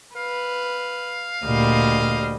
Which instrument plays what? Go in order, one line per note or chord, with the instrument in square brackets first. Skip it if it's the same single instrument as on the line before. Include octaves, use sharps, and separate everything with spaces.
[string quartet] B4 [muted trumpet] F5
[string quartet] D2 G3 D#5 [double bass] A#2